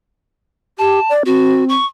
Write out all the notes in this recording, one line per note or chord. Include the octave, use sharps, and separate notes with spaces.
G4 A5
D5
C4 F#4
C#6